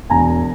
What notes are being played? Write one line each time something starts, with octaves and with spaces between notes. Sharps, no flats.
E1 G#5 A#5